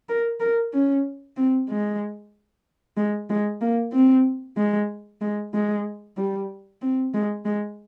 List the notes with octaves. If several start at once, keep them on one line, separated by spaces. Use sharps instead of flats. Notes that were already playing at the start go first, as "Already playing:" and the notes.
A#4
A#4
C#4
C4
G#3
G#3
G#3
A#3
C4
G#3
G#3
G#3
G3
C4
G#3
G#3